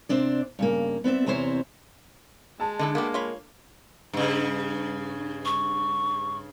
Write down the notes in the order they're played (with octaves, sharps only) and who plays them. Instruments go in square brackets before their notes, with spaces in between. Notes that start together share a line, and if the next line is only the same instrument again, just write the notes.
[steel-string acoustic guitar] C3 C4 D4 D5
G2 C#3 A#3
B3 C4 D5 E5
E2 C3 C4 E4 C5 C#5
[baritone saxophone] G#3 [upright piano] A5
[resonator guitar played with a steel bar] D3 [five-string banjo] D#4 E4 A4
[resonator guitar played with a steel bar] A#3 [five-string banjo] B3 F#4 G4
[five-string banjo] F4 C#5 B5
[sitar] G2 C#3
[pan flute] C#6